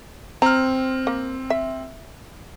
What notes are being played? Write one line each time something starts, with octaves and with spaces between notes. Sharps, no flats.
C4 A#5 F6
A#3
E5